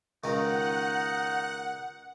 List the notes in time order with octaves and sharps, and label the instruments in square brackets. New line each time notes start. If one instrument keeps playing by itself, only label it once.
[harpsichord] C#2 D#3 [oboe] D#4 [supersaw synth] F#5